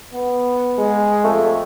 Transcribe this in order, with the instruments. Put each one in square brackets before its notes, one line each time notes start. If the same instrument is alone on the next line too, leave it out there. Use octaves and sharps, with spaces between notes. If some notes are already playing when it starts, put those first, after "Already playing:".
[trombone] B3
[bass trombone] G#3
[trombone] F2 [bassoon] A3